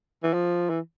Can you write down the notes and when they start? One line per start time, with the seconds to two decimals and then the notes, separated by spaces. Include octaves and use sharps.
0.23 E3
0.33 F3
0.70 E3